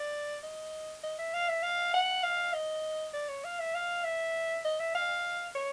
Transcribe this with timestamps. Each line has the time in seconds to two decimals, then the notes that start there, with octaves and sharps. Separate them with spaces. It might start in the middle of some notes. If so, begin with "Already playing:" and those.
Already playing: D5
0.43 D#5
1.04 D#5
1.19 E5
1.34 F5
1.49 E5
1.63 F5
1.94 F#5
2.23 F5
2.54 D#5
3.14 D5
3.29 C#5
3.44 F5
3.60 E5
3.75 F5
4.04 E5
4.65 D#5
4.80 E5
4.95 F5
5.55 C#5